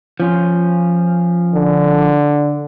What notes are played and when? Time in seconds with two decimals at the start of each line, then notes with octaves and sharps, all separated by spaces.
0.20 F3 C#4 F4
1.55 D3